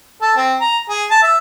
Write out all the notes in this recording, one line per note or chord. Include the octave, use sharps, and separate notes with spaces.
A4
C4
A#5
G#4
A5
E5